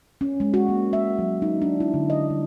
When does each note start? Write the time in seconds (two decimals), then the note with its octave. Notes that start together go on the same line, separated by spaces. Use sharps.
0.21 C#4
0.40 G#3
0.54 F#4
0.69 A#3
0.93 E5
1.19 F#3
1.42 D#4
1.62 D4
1.80 E4
1.94 D3
2.10 D#5
2.30 G3